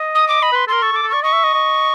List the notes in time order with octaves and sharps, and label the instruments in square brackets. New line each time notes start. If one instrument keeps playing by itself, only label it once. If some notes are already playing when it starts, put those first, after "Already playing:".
Already playing: [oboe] D#5
[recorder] D#6
D6
[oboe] D#5 [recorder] B5
[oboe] B4 [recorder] C6
[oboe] A4 A#4 [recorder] C6
[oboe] A4 [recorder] C#6
[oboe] A4
[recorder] D6
[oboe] A4
[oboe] D5 [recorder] C#6
[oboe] D#5 [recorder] C#6
[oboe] E5
D#5
D#5